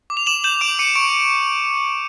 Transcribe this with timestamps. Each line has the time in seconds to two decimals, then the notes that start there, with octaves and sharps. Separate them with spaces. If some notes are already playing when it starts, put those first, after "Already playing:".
0.10 D6
0.17 F7
0.27 D6 E7 F#7
0.44 G6 E7 F#7
0.61 D6 D7 E7
0.79 D6 C#7 D#7
0.96 C#6 D7